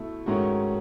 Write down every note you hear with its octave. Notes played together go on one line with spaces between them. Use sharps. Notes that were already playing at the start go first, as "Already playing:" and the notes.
Already playing: B2 A3 E4
G#2 D#3 A3 C#4 F#4